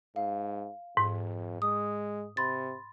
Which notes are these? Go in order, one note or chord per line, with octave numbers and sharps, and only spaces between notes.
G#2 F5
F2 G#2
G#3 D#6
C3 B5 C6 A6